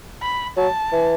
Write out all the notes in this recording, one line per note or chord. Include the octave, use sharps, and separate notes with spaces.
B5
F#3 A5
E3